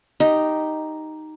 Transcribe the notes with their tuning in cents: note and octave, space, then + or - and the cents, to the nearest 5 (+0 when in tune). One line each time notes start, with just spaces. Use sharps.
D#4 +0 G4 +0